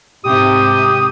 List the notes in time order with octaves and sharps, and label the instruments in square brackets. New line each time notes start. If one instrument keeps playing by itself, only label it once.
[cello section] G#2 C3 [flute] G4 [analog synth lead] D#6